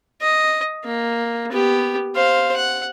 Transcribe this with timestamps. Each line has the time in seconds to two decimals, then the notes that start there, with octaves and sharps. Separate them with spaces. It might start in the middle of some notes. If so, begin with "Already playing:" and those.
0.21 D#5
0.85 A#3
1.52 B3 G4
2.15 C5 F5
2.56 F#5